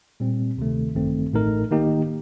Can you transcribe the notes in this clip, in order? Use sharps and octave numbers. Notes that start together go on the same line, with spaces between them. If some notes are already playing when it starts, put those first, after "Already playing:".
A#2 G3 C4
D2 C3 D#3 A3
A1 G2 D#3 A3 C4
A1 A2 A3 D#4 A#4
D#3 A#3 D#4 G4